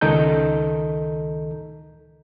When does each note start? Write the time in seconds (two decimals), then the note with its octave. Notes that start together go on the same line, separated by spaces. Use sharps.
0.01 C#2 D#3 A4 D#5 A#5 G6